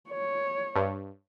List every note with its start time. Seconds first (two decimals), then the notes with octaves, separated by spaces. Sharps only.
0.10 C#5
0.76 G2